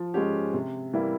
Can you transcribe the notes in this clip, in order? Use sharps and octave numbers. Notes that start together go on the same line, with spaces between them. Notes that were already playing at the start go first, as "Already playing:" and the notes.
Already playing: F3
G#3 C#4 G4
C3
E3 G3 A#3 E4